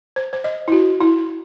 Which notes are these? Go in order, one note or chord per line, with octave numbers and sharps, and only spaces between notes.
C5
C5
D#5
E4
F#4
E4